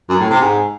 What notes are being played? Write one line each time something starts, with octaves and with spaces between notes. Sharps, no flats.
F#2
A2
C3
G#2